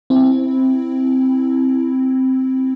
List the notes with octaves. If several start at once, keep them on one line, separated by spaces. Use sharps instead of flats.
C4 E4